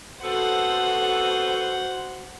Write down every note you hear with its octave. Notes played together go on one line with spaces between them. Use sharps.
B3 C4 F#4 A4 C5 F#5